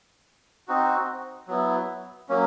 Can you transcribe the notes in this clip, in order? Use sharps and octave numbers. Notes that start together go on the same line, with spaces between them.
C4 D#4 F#4
F#3 B3 E4
F#3 A#3 C#4